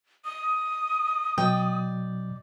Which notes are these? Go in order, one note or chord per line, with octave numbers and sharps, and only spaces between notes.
D#6
B2 F#3 D5 D#5 G5